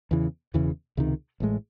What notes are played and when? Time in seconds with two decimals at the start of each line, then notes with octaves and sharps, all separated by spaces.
0.11 E2 C#3 E3
0.54 E1 E2 C#3 E3
0.97 C#2 C3 D#3
1.40 A1 A2 G#3